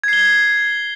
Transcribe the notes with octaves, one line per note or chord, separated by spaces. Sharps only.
G#6 C7 G7